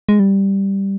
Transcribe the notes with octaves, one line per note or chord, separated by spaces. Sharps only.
G#3
G3